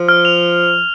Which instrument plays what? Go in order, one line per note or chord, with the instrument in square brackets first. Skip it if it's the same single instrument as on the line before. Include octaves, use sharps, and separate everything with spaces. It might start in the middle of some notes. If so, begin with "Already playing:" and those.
Already playing: [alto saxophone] F3
[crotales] F6
F7